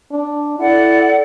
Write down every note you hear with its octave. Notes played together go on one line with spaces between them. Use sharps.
D4
E4 A4 D5 F#5